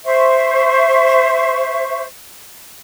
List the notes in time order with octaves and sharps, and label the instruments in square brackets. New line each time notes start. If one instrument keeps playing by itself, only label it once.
[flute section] C5 E5 C#6